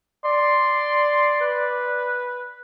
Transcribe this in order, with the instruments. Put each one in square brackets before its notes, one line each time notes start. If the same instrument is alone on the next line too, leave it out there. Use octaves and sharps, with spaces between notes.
[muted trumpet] D5 [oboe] C6
[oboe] B4